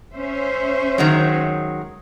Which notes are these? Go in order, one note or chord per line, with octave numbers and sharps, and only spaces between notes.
C#4 C5 E5
D#3 F#3 G#3